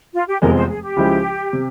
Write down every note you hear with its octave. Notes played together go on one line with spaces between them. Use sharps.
F4
G4
F1 E2 C3 F3 G#3 A#4
C5
G#4
G4
C#2 C#3 F3 G#3 E4
C3